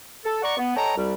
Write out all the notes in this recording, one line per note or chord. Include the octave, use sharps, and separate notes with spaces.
A4
D5 F#5 A#5 C#6
B3
A4 C#5 D#5 G5 A#5
C2 G3